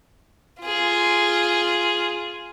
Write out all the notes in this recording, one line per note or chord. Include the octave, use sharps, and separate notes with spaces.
F4 G#4